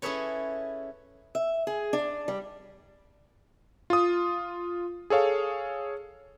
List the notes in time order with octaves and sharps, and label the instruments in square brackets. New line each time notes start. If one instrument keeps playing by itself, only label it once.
[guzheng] C#4 E4 G#4 A4 B4 C#5
[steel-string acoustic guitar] E5
G#4
D4
G3
[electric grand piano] F4 D#6
G#4 A4 C#5 F5